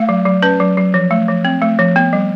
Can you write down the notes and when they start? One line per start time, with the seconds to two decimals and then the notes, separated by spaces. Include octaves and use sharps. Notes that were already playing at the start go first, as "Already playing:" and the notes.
Already playing: A3 F5
0.09 F#3
0.26 F#3
0.42 C#4 B4
0.60 F#3
0.77 F#3
0.94 F3
1.11 A3
1.28 F3
1.45 C4
1.62 A3
1.79 F3
1.96 B3
2.13 G3